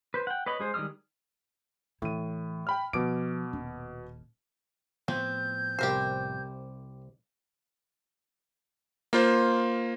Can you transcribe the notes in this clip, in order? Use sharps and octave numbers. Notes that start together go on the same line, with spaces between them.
B4 C5
F#5 G5
B4 C#5 D#5 B5
G#3 G#4 C5
D#3 G3 G#3 D#6 F6
A2 E3 D#7
G5 B5 F6
B2 F3 D6 D7
D#1
A2 F3 B3 C4 G6
C2 C3 G4 A#4 C5
A#3 F4 C5